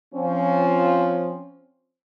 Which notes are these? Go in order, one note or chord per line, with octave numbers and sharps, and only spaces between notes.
F3 C4 C#4